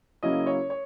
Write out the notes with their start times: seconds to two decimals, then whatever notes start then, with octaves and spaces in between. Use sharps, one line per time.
0.23 C#3 F#3 A#3 C#4 E4 D#5
0.46 C#5
0.70 C#5